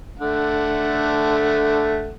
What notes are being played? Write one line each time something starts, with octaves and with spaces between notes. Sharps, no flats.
D3 A3 F#5